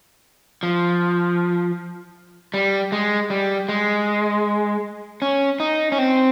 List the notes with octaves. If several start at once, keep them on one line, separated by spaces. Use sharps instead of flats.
F3
G3
G#3
G3
G#3
C#4
D#4
C#4
C4